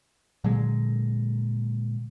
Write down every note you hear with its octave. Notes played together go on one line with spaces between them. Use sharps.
A#2 D3 F#3 G#3